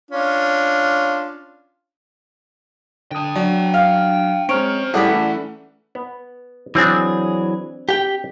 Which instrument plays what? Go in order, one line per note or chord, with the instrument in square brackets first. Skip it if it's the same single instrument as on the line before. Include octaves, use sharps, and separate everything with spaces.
[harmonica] C#4 D4 F4
[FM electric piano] D3 D#6 [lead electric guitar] G5 A5
[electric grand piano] F#3 [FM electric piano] D4
[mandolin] F5
[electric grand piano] G#3 D7 [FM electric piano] C4 F6 [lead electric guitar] C#4 A#5 [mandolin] C#5
[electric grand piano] A2 G3 G#4 [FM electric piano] E4 A4 D5 [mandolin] F#5 B5
[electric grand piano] E3 A3
[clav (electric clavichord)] B3
[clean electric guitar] E3 F#3 G#4 [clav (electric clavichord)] C4 D4
[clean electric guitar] G4 G5